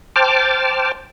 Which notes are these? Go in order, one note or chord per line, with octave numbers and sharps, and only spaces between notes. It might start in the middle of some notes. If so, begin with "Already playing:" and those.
C5 G5 A5 D6 F6